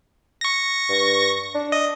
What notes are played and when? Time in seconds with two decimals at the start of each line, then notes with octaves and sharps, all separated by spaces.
0.41 C#6 A#6
0.89 G2
1.54 D4
1.72 D#5